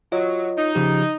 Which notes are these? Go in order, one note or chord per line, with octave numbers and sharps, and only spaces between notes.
F#3 F4 C#5 D#5
D#4
C#3 F3 G4